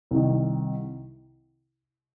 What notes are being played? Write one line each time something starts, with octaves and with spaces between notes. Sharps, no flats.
C2 C3 D#3